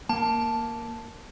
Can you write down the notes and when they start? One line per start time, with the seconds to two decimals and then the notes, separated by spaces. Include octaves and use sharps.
0.09 A#3 A5